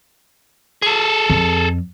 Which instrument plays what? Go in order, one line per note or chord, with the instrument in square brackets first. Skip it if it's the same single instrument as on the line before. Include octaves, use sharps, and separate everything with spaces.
[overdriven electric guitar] G#4 A4
[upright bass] F2